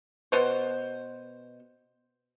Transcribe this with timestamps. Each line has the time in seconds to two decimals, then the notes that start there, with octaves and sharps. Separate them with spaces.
0.32 B2 C5